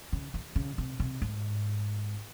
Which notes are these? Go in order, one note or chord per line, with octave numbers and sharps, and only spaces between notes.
C#3
D#3
C#3
C3
C3
G#2